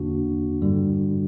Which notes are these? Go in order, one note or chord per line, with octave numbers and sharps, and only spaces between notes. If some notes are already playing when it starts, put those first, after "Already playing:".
Already playing: E2 D3 A#3 D4 F#4
G2 D3 G3